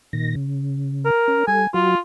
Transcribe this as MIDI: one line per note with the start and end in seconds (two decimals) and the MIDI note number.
0.13 0.35 46
0.13 0.35 51
0.13 0.35 94
0.36 1.10 49
1.05 1.43 70
1.28 1.43 61
1.47 1.67 55
1.47 1.67 69
1.47 1.66 80
1.74 1.95 54
1.74 1.98 65
1.74 1.95 66